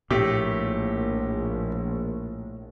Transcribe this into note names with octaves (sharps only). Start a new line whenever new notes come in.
A#1 A2 G4